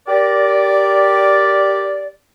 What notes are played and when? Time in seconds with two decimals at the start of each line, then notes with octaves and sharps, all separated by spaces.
0.07 G4 A#4 D5